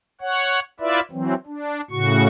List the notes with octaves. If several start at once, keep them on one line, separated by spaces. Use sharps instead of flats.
C#5 F#5
E4 F4 B4 D5 E5
E3 F#3 C4
D4
A2 C#3 F#4 C#6